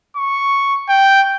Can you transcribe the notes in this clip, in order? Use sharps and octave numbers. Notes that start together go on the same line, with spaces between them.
C#6
G5